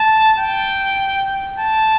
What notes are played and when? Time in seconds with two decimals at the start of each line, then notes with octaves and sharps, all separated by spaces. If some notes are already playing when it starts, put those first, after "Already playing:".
Already playing: A5
0.40 G5
1.59 A5